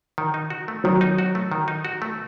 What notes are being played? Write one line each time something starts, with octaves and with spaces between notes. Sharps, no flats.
D#3
D#4
F#4
A3
D#3 F#3
D#4
F#4
A3
D#3
D#4
F#4
A3